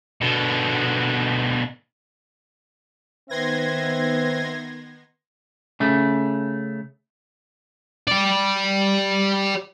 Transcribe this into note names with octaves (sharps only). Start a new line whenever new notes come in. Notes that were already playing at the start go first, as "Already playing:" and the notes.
B2 D3
D#3 B3 C4 B4 E5 C6 G#6 A#6
C#3 A3
G4 D5